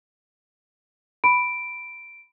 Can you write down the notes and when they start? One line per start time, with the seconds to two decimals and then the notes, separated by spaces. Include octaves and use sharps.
1.24 B5 D7